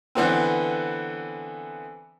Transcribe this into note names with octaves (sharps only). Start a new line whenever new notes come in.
D3 E3 B3 C4